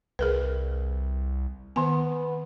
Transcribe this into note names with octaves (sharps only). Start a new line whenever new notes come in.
C2 G#4 A#4 B4
D#3 B3 G#5